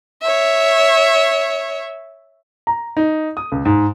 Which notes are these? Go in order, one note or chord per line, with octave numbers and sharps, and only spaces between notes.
C#5 E5
A#5
D#4
D#6
C#2
G#2